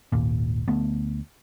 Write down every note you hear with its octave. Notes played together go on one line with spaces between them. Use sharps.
G#1 D#2 A#2
D2 A3 B3